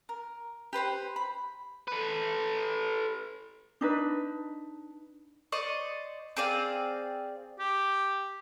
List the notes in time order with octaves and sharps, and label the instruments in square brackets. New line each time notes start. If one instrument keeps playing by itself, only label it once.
[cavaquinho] A#4
G4 B4 C5 G5
B5
[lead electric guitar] A4 B4
[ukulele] D4 D#4 B4
[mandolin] C5 D5 D#5 C#6
C4 G#4 D5 F5
[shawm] G4